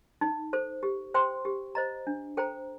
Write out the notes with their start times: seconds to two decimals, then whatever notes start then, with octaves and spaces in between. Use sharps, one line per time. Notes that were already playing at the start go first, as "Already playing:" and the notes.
0.21 D#4
0.53 A4 C5
0.83 G4
1.14 C5 G5 C6
1.45 G4
1.75 C5 D#5 A#5
2.07 D4
2.37 A4 C5 G5 A#5